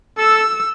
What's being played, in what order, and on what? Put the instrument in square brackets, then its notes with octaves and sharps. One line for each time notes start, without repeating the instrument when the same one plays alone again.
[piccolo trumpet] A4 [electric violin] E6